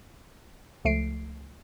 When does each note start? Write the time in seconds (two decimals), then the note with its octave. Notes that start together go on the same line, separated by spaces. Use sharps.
0.85 C#2 F3 A3 C7 D7